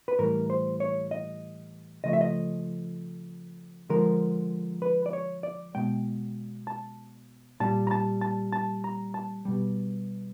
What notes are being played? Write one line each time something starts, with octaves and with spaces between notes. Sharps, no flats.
B4
A2 E3 G3 A#4
C5
C#5
D#5
C#3 F3 A3 D#5
E5
D#5
D3 F3 G#3 A#4
B4
D5
C#5
D5
B2 G#3 G5
A5
A#2 G3 A5
A#5
A5
A5
A5
A#5
A5
B2 G3